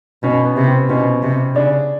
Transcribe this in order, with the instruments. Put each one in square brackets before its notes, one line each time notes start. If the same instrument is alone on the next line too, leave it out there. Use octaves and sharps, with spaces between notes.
[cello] B2 [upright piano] C#4
[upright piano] B3
[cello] C3
[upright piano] C4
[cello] B2 [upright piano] C#4
[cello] C3
[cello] C#3 [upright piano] D4